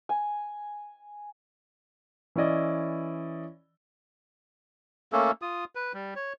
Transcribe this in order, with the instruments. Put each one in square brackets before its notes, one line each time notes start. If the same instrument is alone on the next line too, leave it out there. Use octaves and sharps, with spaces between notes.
[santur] G#5
[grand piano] E3 C#4 E4 D5 D#5
[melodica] A3 A#3 C#4 A4
F4 D#6
B4
G3
C#5